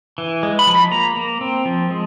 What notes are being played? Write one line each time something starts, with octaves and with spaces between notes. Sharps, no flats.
E3
G#3
B5
F3
B5
A#3 A#5
A#3
C4
F3
G#3